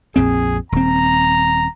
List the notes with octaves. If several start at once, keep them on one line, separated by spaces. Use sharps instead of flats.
A#1 F2 C4 G#4
D#1 C4 A#5